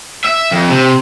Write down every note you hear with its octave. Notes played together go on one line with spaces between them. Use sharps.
E5
F2
C3